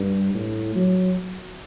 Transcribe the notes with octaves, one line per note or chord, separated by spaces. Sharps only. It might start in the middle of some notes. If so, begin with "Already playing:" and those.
Already playing: G2
A2
F#3